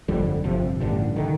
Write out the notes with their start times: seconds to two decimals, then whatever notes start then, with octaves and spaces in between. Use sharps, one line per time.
0.08 G1 F2 D3 G3
0.44 G1 F2 C3 F3
0.80 A1 G2 D3
1.16 D3 D#3